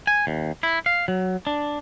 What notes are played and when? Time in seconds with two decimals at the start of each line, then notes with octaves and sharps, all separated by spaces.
0.07 G#5
0.27 D#2
0.63 E4
0.86 F5
1.08 F#3
1.47 D4